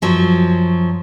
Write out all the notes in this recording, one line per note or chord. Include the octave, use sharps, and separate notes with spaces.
F#2 F3 F#3